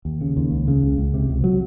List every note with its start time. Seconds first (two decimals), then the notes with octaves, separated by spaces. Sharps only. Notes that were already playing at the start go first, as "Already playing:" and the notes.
0.05 D#2
0.21 C#3
0.37 D#2
0.51 C#2
0.68 C#3
0.82 C#2
0.98 C#2
1.14 C3
1.29 C#2
1.44 F#3